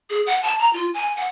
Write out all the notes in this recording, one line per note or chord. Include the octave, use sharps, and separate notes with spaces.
G#4
F#5
A5
A#5
F4
G#5
F#5